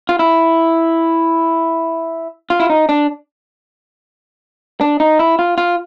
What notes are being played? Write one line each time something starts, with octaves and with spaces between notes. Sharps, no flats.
F4
E4
F4
E4
D#4
D4
D4
D#4
E4
F4
F4